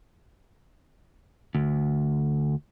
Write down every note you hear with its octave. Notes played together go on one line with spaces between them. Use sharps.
D2